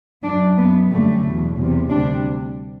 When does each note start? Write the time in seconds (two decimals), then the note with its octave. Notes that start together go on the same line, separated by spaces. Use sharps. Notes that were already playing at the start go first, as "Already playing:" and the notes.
0.23 F#2 F#3 D4
0.57 F#2 F#3 B3
0.90 F#2 D3 G3 A3
1.23 E2 B2 F#3
1.57 E2 C3 G3
1.90 D2 C3 G3 D4